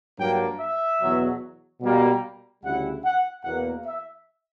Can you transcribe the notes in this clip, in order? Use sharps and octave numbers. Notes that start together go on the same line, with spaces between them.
G2 F#3 A#3 D4 G5
E5
E2 B2 F#3
B2 G3 A#3
D2 C#3 G3 C#4 E4 F#5
F#5
E2 B2 A#3 F#5
E5